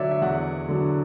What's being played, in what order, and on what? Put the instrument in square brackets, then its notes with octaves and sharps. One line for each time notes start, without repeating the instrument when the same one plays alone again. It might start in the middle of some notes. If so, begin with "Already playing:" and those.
Already playing: [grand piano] D3 F#3 C#5 D5 E5
E5
E2 F#5
D3 F#3